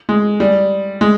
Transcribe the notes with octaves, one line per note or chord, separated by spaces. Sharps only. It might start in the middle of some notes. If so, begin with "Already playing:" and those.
G#3
G3
G#3